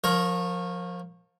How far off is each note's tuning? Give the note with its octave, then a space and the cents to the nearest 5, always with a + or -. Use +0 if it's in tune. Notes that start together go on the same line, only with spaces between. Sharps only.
F3 +25 A#4 +0 C#5 -20